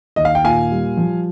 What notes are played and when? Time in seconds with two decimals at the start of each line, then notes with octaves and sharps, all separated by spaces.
0.16 D#2 D#5
0.25 F5
0.35 G5
0.44 A#2 F5 G#5
0.71 G3
0.97 F3